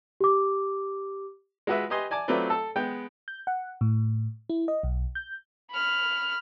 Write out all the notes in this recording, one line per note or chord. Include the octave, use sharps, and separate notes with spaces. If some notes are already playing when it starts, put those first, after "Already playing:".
G4 D6
G#3 F4 F#4 B4 E5
G4 B4 D#5 G#5 C6
D5 G#5 A5 D6
F#3 A3 C4 F4 B4 D5
A4 A5 E6
G#3 B3 G5
G6
F#5
A2
E4
D#5
B1
G6
B5 F6